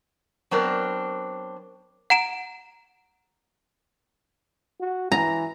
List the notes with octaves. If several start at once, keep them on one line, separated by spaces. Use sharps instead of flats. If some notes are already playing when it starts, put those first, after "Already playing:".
F#3 B3 C4 D4 A#4 B4
F#5 A#5 D7 E7
F#4
E3 A#5